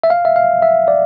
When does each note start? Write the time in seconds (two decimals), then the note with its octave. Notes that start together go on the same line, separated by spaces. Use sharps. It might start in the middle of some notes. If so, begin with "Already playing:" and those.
0.04 E5
0.10 F5
0.25 E5
0.36 F5
0.62 E5
0.88 D5